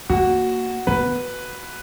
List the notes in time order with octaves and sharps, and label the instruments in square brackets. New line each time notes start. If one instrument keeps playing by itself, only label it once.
[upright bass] A#3 [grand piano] F#4
[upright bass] B3 [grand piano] B4